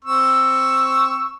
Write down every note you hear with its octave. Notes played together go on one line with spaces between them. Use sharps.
C4 C#6 E6